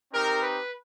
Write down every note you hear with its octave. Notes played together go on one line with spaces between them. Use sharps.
C4 D#4 G4 A#4
B4